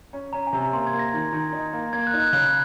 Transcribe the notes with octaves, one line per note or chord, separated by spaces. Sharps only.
C#4
C#4 A#5
G#5
C3
A#3 C6
G#6
A#3
A#6
D#3
D#3
D#4
A#3
A#3 G#6
F#6
D#4
F#6
C#3 F#6